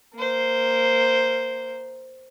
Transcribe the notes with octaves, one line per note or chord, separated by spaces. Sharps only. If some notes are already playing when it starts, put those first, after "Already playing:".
A#3 C5